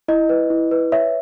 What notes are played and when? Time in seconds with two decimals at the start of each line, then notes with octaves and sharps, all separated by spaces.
0.08 E4 D#5
0.29 B4
0.50 E4
0.71 B4
0.92 C#5 E5